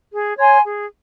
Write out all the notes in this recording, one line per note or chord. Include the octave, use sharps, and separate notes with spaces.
G#4
C#5 G#5 C6
G#4